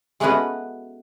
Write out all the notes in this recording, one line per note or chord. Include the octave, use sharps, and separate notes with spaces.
G#3 A3 B3 C#4 F#4 B4